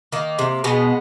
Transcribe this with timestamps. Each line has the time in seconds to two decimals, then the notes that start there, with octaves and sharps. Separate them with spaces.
0.12 D#3 A#3
0.39 C3
0.64 B2 G#3 B3